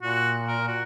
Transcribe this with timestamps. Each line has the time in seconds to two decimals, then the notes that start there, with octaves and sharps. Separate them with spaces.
0.02 A#2 F#4
0.47 A#4
0.68 F#4